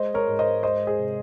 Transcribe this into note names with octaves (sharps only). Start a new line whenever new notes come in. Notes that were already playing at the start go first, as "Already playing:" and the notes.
Already playing: G#3 C5 D#5
A#4 C#5
G#2
C5 D#5
G#3 C5 D#5
G#4 C5
C3